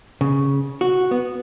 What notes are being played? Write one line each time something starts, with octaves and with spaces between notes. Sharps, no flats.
C#3
F#4
B3